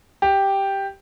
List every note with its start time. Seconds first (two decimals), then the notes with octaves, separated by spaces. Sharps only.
0.22 G4